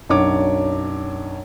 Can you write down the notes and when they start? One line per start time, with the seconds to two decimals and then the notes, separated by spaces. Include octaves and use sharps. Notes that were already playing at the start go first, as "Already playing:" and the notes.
0.09 B1 F#2 D4 C#5 D6